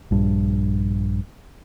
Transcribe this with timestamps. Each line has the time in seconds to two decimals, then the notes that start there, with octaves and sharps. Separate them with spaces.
0.11 A#1 G2